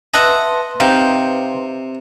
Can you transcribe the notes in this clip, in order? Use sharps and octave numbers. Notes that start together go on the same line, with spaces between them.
B4 D#5 E5 F#5 A5 C6
C3 D#4 F5 G5 G6